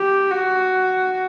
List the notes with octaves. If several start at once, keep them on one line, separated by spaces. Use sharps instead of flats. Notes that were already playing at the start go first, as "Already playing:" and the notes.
Already playing: G4
F#4